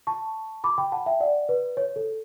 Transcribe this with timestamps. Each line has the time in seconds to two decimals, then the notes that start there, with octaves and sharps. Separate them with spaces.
0.07 A5 C#6
0.64 B5 D6
0.78 G5 B5
0.92 F#5 A5
1.06 E5 G5
1.20 D5 F#5
1.49 B4
1.77 C#5
1.96 A4